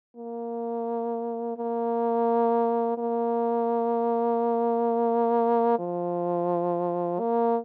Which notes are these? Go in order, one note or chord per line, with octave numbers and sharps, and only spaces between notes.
A#3
A#3
A#3
F3
A#3